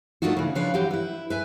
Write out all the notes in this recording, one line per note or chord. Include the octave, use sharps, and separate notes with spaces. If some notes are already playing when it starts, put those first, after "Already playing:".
A3 A#3 D4 D#4 F4 F#4
C#3 E3
C#3 F3 D4 B4 C#5 F5
E3 F#3 G4
E4 B4
B4 E5 G#5